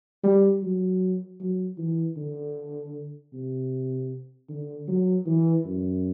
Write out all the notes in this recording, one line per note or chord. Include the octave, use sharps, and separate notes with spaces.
G3
F#3
F#3
E3
D3
C3
D3
F#3
E3
F#2